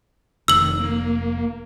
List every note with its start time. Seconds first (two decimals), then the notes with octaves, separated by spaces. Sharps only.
0.48 F1 D#3 E6 F#7
0.79 A#3